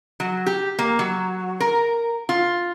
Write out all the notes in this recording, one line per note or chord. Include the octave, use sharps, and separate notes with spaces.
F#3
G4
A#3
F#3
A#4
F4